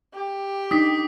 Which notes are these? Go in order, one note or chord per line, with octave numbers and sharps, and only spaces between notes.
G4
D4 D#4 D#6 B6